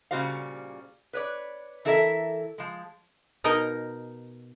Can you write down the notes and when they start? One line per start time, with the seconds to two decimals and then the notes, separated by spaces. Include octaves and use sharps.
0.11 A#2 C#3 G3 F#4 C5 F5
1.13 B4 C#5 D5
1.85 E3 E4 A4 A#4 C5 E5
2.58 F3 G#3
3.44 B2 D#4 A#4 D#5